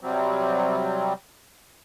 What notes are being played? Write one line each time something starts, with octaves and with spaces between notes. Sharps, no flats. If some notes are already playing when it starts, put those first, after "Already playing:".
C3 F#3 G3 C4